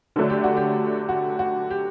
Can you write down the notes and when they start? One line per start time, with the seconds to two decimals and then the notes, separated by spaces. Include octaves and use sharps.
0.16 D3 F#3 A3 D4
0.30 G4
0.44 F#4
0.57 G4
1.09 F#4
1.39 F#4
1.70 G4